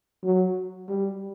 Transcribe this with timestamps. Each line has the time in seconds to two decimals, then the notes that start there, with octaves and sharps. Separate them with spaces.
0.24 F#3
0.89 G3